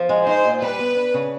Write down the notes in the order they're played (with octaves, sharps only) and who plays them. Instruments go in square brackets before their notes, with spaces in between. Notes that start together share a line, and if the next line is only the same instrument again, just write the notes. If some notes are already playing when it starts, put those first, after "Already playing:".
Already playing: [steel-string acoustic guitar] F3
G#3
[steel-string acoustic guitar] D#4 [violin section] C5
[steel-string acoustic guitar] A#2
[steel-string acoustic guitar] G3 [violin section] B4
[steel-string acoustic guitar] B3
D4
C#3